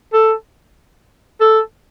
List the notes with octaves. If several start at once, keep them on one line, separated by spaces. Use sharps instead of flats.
A4
A4